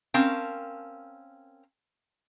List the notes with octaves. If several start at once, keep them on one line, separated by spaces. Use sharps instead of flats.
C4 C#4 A#4 F5 A5